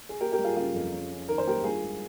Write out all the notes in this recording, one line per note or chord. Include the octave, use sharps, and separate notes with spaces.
G#4
A#3 G4 A#4
G4 A#4
G3
F4 G#4
C#3 F4 G#4
F2
C#4
C#4
D#3 A#4
C5
A#3 G4 A#4
G2 F4 G#4
G#3